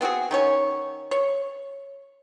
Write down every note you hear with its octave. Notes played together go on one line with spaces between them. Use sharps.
B3 C4 F#4 G#4
D#3 C#4 C#5 G#5
C#5